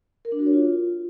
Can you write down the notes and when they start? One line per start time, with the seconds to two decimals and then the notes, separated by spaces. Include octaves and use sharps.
0.25 A#4
0.32 D4
0.39 F#4
0.46 C#5
0.53 F4